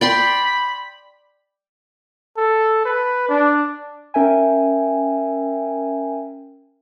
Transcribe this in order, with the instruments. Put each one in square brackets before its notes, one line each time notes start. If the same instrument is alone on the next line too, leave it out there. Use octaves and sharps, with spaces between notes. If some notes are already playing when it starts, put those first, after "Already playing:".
[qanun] D5 G5 C6 [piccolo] B5
[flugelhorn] A4
B4
D4
[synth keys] C#4 A#4 E5 G5 G#5